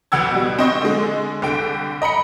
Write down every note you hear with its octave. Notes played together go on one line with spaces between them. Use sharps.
A1 D2 F#5 G5 E6 G#6
B2 G3
C4 D#5 C#6
D3 G#3
C2 D3 G5 D7
D#5 A#5 B5 C#7